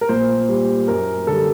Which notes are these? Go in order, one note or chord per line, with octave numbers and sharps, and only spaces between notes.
A#4
A#2 C5
G3
F#2 A#4
D3 G3 A4